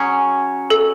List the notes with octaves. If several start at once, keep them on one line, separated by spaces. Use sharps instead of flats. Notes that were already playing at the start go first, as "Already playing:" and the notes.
Already playing: F#3 C#4 G#4
A4